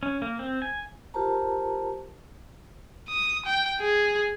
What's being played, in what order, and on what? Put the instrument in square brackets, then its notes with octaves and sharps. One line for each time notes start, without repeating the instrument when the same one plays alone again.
[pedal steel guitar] C#4
A#3
C4
G#5
[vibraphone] F4 G4 A#4 C5 A5 A#5
[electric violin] D#6
G5
G#4